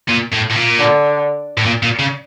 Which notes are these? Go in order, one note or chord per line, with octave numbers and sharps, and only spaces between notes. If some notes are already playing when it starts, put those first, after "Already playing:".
A#2
A2
A2
A#2
D3
A2
A#2
A#2
C#3